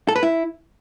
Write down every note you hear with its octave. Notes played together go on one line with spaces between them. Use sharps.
A4
B4
E4